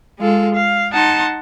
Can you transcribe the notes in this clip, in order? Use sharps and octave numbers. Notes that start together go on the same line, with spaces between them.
G#3 F4 A4
F5
D#4 F#5 A5 C6